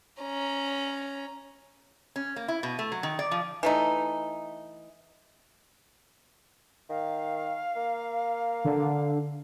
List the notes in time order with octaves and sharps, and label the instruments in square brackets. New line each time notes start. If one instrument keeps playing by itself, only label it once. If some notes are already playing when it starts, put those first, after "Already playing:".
[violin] C#4 A#5
[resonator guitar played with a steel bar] C#4
A#3
E4
B2
A3
F#3
D#3
D5
F3
[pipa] E3 A3 D#4
[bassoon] D#3 [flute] F5
[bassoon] A#3
[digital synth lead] D3